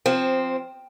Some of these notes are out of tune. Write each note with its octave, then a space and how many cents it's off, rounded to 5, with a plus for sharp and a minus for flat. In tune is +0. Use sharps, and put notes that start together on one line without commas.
F3 +10 C4 +0